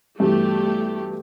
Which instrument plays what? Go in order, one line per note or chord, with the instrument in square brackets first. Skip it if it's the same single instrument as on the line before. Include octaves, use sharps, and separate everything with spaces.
[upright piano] G2 B2 E3 [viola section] A3 G4